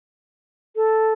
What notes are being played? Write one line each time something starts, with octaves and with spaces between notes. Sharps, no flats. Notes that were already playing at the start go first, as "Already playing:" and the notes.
A4